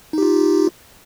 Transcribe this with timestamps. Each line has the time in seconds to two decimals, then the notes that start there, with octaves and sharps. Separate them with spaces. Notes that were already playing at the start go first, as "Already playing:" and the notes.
0.13 D#4
0.18 G4
0.23 F4